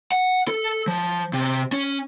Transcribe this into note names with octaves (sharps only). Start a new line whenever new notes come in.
F#5
A4
F3
C3
C#4